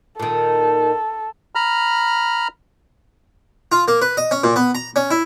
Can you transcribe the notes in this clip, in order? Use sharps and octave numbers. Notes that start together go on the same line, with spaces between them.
A#2 D#3 A4
A#5 B5 F6
F4
A#3
B4
D#5
C#4
A#2
B3
A#5
C#4
E4